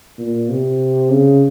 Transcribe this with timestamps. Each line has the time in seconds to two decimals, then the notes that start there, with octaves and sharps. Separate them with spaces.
0.18 A#2
0.49 C3
1.10 C#3